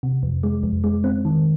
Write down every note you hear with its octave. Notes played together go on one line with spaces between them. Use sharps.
C3
F2
G#3
F2
G#3
C4
D#3